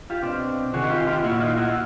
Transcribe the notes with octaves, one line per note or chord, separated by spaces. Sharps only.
F4 G4
B2 C4 D4
C3 D#3 F#4 G#4
F4 G4
F4 G4
A#2 E4 F#4
D#4 F4
E4 F#4
F#4